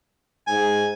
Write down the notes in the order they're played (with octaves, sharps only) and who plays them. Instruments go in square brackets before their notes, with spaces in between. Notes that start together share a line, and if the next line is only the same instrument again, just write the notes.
[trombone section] G#2 [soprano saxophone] G#5